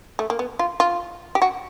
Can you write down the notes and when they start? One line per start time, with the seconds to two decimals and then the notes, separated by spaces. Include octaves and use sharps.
0.19 A3
0.30 A#3
0.39 B3
0.59 F4
0.80 F4
1.35 G4
1.42 F#4